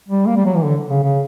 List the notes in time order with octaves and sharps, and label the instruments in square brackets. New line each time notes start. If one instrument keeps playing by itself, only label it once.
[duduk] G3
A#3
G3
F#3
E3
D3
C#3
C#3